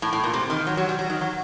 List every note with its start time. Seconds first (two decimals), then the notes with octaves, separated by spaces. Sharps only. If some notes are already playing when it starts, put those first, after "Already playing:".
0.02 A2
0.13 A2
0.24 A#2
0.33 C3
0.50 D#3
0.67 F#3
0.77 F#3
0.89 G3
0.99 F#3
1.10 D#3
1.21 F#3